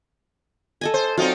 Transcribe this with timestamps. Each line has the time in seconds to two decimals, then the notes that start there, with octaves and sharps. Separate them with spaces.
0.81 A4 D#5 G#5
0.94 C5
1.17 F#3 C4 D#4 F4 D5